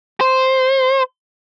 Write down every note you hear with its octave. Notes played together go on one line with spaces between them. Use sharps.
C5